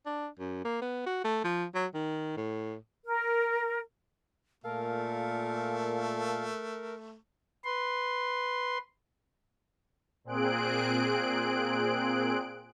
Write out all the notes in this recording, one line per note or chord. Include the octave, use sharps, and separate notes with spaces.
D4
F#2
A#3
B3
F#4
A3
F3
F#3
D#3
A2
A#4
A#2 A3 A4 A#4 F5
B4 C6
A#2 C4 G#4 F#6 D7